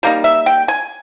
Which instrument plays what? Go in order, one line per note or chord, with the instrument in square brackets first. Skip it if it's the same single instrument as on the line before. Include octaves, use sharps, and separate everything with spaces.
[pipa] G3 A#3 D#4
E5
G5
G#5